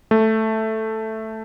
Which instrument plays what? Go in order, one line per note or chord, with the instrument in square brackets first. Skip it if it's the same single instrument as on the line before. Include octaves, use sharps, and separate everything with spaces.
[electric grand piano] A3